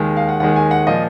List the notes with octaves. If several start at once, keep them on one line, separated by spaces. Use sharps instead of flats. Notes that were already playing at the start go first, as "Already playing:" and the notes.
Already playing: D#2 D#3 G#3
F5
F#5
D#2 D#3 G#3 F#5
G#5
F#5
A#2 F3 D#5